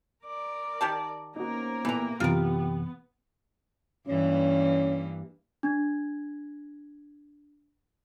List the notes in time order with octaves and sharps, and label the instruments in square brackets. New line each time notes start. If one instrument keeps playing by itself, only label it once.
[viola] A#4 D5
[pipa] D#3 G4 A5
[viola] A#3 A#4 [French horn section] B3 C#4 C5 [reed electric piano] D#4 F#4
[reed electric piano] A#2 B3 [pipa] E3 A#5 [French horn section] G4 A4
[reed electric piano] F#2 C3 E3 [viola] B3 [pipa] F4 A#4 [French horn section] G4
[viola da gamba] G2 E3 A#3 [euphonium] C#4
[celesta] D4 G#6